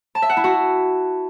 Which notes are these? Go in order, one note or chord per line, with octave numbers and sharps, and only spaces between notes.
A5
E5
F#5
E4
F#4